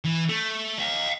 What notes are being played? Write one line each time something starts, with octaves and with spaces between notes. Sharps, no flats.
E3
A3
D#5 F5